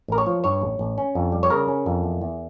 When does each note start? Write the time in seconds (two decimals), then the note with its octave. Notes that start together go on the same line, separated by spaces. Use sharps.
0.08 A1 A#4
0.18 C#5
0.26 F3
0.44 G2 C#5
0.62 A1
0.79 A1
0.98 C#4
1.15 F2
1.32 G3
1.43 C#5
1.50 C#3 A#4
1.68 C#4
1.86 F2
2.04 E2
2.21 E2